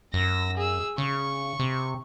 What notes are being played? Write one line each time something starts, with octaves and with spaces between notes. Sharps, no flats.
F#2 E6 A#6
G#4 E6
C#3 C#6
C3